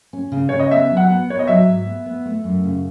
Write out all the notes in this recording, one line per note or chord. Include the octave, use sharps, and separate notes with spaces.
C#4
C#3
C#3 C#5
D#5
B3 E5
F#3
F#5
B3
B3 C#5
D#5
F#3 E5
G#2
B3
B3
A3
F#2
C#3